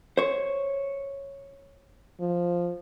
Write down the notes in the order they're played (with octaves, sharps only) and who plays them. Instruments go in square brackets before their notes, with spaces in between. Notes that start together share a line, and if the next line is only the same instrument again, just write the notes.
[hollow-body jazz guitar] C5 C#5
[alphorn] F3